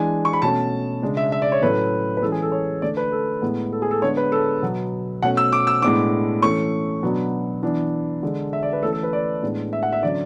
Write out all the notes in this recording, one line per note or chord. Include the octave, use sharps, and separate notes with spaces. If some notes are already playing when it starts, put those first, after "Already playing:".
Already playing: E3 G#3 D4 G#5
C#6
B5
B2 A3 C#4 A5
C#3 G#3 D4
E5
E5
D5
C#5
A2 F#3 A3 C#4 B4
B4
E3 G#3 C#4 A4
G#4
A4
C#5
D3 A3 D4 D5
B4
A4
A2 G#3 B3
A4
G#4
A4
D3 G#3 B3 D4 C#5
B4
A4
B2 F#3 B3
B2 A3 C#4 F#5
E6
D6
E6
A2 G#3 B3 D4 D6
E3 A3 C#4 C#6
B2 F#3 B3 D4
E3 B3 D4
D3 G#3 D4
E5
D5
B4
E3 A3 C#4 A4
A4
B4
D5
A2 G#3 B3 D4
E5
F#5
E5
D3 F#3 C#4 D5